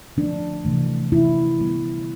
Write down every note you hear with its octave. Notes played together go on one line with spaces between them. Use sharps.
D3 F3 A3 D4
C3 E3 A3
C3 E3 A3 E4
D3 G3 B3